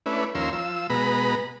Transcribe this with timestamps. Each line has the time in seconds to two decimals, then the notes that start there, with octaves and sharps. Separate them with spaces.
0.06 A3 C#4 D4 E4 B4
0.35 D#2 F3 C#4 A#4 C6 E6
0.53 F3 E6
0.90 B2 G#3 B3 A#5 B5